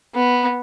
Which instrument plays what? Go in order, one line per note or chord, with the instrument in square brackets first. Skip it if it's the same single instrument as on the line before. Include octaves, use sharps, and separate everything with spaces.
[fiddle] B3